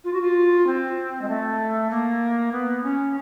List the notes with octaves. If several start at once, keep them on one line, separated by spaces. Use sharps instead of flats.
F4
F#4
F4
C4
G#3
A3
A#3
B3
C#4